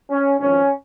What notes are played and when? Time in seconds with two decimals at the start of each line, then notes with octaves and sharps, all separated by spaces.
0.10 C#4
0.39 G#1 G#2 F3 C#4